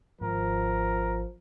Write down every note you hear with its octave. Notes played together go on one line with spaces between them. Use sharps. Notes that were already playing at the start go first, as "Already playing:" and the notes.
G#1 F3 A#4